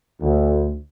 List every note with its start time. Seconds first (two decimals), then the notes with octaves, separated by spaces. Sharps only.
0.21 D2